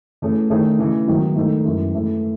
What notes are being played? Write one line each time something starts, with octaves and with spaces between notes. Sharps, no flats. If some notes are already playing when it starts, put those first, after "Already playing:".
E3 A3 C#4 G#4
D#3 A3 D#4 G#4 C#5
C#3 E3 A3
G#2 D#3 F#3 B3 D#4
G#2 D#3 A3 D#4 A4
F#2 E3 G#3
G#2 E3 A3 E4 A4